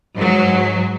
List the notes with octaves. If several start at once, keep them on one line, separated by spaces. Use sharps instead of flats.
G#2 F#3